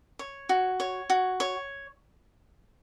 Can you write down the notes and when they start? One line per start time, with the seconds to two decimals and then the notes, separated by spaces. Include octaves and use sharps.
0.19 C#5
0.49 F#4
0.80 C#5
1.10 F#4
1.40 C#5